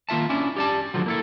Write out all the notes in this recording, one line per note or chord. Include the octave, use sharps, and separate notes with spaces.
D#3 A#3 F4 E5 A5
C#4 D4 E4
G4 D5 A5
D2 D3 F3 F#3
A#3 E4 A4